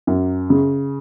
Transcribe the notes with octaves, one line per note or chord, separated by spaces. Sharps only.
F#2
C#3